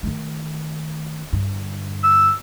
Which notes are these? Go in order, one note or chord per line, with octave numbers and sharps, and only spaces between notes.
D#3 A3
G2 D3
E6